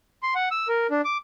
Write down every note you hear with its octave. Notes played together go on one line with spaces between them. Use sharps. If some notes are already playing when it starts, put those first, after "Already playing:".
C6
F#5
E6
A#4
D4
D6